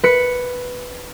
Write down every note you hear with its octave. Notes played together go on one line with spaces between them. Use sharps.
B4 C#7